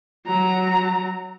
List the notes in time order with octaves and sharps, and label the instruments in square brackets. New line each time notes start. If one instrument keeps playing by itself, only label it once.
[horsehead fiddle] F#3 A#5